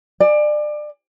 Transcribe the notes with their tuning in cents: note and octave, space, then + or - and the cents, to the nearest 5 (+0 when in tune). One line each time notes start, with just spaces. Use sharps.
D5 +25 G#5 +0